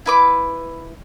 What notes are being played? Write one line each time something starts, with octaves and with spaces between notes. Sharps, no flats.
E4 B4 D6